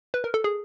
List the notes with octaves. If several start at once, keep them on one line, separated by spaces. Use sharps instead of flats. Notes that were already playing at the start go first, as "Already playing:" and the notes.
B4
A#4
A4
G#4